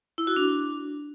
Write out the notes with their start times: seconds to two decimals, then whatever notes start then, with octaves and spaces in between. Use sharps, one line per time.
0.18 E4
0.27 F#4
0.36 D4